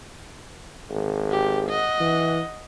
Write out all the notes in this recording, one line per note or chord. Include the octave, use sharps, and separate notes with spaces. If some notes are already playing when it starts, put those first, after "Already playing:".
G#1
G4
D#5 F#5
E3